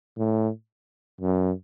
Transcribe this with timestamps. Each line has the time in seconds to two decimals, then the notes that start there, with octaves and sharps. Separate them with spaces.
0.18 A2
1.21 F#2